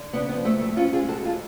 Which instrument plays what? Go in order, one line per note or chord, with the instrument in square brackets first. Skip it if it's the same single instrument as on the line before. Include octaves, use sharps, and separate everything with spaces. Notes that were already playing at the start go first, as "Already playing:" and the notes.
Already playing: [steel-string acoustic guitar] D3
C#3 B3 D4
B3
F3
A3
D2
A3
F2 C#4 F4
F4 G#4
G#3
F#4 A4
F2
F4 G#4